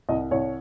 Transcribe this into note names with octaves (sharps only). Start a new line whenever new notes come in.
C2 D#5
C2 C#5